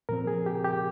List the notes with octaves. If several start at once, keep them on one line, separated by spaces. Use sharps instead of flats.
A#2 F3 C4 A#4
G#4
G4
G4